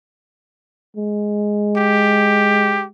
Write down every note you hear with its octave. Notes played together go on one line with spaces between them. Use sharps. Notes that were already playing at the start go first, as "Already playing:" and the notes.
G#3
G4